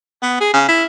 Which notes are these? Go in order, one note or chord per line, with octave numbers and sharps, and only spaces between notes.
B3
G#4
C#3
E4